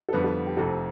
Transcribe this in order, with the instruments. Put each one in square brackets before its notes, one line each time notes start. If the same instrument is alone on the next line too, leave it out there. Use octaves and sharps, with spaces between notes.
[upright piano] A4
[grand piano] F2 D3 G3 B3 [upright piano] B4
[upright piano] A4
G4
[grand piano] F1 F2 C3 [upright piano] A4